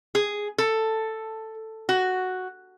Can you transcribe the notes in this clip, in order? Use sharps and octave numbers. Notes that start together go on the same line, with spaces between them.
G#4
A4
F#4